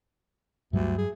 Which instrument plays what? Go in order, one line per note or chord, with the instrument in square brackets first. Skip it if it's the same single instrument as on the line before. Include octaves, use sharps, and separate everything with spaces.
[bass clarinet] D2 [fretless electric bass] G2 F#3 G3
[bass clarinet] G#4